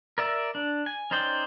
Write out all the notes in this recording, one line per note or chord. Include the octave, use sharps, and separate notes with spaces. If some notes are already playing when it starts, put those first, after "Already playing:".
A#4 D5 E5
D4
G#5
C#4 D#4 C5 D5 G5